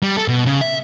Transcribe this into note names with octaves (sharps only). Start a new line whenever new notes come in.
G3
A4
B2
C#3
E5